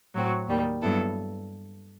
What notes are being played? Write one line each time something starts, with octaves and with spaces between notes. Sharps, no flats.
A2 F#3 C4 F#4
D#2 D#3 G3
G2 F#3 B3 E4 A4